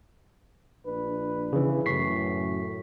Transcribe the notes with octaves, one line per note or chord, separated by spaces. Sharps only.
A#1 D4 B4
C#3 E3
F#2 A2 C#6 B6 C7